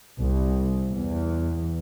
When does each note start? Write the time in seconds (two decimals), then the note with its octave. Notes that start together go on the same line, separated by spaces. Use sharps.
0.20 C2
0.90 E2